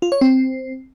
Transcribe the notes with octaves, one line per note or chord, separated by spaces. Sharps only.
F4
C#5
C4